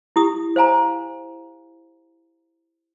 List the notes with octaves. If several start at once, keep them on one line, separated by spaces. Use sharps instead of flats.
E4 G4 D#6
C5 F5 G#5 A#5